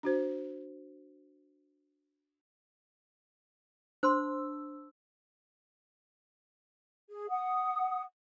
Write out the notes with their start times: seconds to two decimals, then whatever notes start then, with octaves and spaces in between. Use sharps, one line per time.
0.03 D4 F#4 C5
4.03 D4 C5 C6 E6
7.10 G#4
7.30 F#5 D#6